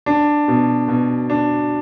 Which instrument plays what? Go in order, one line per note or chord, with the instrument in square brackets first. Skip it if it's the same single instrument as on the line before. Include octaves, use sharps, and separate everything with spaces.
[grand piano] D4
B2
B2
D4